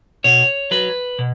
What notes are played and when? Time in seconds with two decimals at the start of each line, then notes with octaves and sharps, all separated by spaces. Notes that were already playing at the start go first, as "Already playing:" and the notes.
0.24 B2 C#5
0.71 F#3 B4
1.19 B2